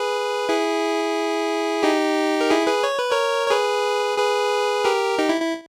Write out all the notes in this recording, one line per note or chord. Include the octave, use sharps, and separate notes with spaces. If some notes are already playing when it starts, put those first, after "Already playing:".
Already playing: G#4 B4
E4 G#4
D#4 G4
A#4
E4 G#4
G#4 B4
C#5
B4
A#4 C#5
C#5
G#4 B4
G#4 B4
G4 A#4
D#4 G4
E4
E4